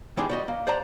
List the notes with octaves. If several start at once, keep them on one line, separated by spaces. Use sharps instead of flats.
D#3 E3 G3 G#3 D4 G#4
G3 F#4 D#5
A#3
C5 D5 F#5 A5 A#5